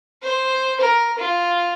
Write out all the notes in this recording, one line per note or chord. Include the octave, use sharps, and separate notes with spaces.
C5
A#4
F4